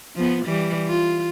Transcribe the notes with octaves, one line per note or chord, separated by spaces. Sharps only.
F3 B3
E3 G3
F4